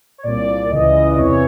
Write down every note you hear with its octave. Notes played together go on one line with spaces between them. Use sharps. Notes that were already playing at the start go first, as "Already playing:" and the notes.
C#5
C2 A#2 D5
C#2 C#3 E3 D#5
D5
E2 C3 E3 C#5